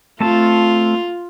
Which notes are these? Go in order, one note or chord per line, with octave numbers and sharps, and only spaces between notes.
A3 C4 F4 A5